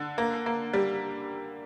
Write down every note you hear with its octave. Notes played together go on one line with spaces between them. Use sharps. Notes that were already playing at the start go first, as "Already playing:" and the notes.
Already playing: D3
A#3
A#3
G3